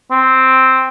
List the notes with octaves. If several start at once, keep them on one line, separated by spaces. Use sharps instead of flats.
C4